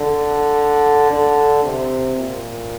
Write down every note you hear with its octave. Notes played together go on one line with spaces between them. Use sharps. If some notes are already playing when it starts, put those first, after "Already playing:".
Already playing: D3
D3
C3
A#2